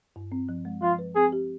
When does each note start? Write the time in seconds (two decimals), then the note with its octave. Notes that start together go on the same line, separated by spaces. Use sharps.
0.16 G2
0.32 C4
0.49 F3
0.65 G#3
0.82 F3 F4
0.99 B4
1.16 C4 G#4
1.32 G4